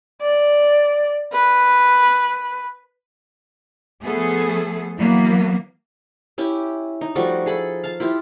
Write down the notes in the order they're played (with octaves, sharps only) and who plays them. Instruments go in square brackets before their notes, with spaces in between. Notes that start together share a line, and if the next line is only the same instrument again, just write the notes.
[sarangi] D5
B4
[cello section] F3 A3 B3 G#4 A4
E3 F#3 A#3 B3
[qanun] C#4 E4 G4
D#4
F3 G3 A3 F#4
G#4 A4 B5
F5 A5
E4 F4 G4 E5